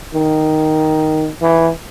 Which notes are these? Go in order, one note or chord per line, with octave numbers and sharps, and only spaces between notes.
D#3
E3